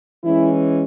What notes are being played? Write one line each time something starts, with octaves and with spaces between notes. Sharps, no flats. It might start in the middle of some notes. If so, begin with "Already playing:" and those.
E3 G#3 C#4 E4